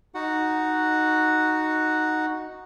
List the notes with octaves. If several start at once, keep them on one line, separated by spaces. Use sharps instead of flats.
D#4 F#4 F#5